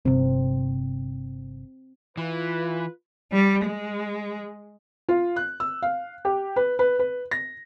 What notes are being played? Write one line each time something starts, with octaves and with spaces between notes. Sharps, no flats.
G1 C3 C4
E3 F4 B4
G3
G#3
F4
F#6
E6
F5
G4
B4
B4
B4
A#6